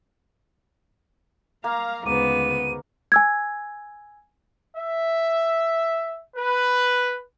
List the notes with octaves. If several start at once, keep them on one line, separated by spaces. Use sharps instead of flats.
A#3 F5 A#5
D2 G#2 C#3 B3 D6 D#7
G#5 E6 G#6
E5
B4